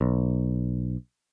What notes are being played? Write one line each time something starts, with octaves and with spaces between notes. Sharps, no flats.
B1